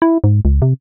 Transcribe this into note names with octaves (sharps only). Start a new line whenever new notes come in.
E4
G#2
C#2
C3